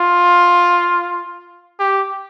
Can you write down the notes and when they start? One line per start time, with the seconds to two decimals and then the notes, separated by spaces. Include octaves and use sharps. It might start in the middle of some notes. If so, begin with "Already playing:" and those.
Already playing: F4
1.79 G4